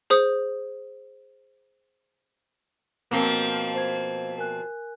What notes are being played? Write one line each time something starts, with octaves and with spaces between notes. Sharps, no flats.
G#4 C5 D#6
B2 F3 A#3 C4
C5 F5 G#6
A#4 G#5 F#6